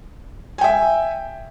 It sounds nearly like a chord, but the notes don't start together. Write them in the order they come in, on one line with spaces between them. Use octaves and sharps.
G#5 G5 E5